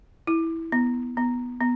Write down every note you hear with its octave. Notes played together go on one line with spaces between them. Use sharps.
E4
B3
B3
B3